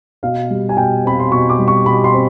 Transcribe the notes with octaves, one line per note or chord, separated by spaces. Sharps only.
B2 F5
G3
G#5
B2 G5
C4 B5
C6
B2 C#6
D6
G3
C#6
B2 B5
C6
C4